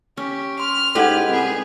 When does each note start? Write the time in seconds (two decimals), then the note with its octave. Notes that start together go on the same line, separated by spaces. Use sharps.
0.17 C#4 G4
0.60 C6 F6
0.95 G#2 E4 G4 A4 B4 F#5 G#6
1.29 C2 B3 G#4